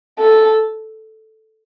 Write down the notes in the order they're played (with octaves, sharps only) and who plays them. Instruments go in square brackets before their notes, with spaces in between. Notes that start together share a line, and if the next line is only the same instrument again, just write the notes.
[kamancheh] A4